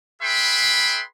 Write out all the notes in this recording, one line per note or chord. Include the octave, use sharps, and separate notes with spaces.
G#4 B4 E5 G5 B5 C6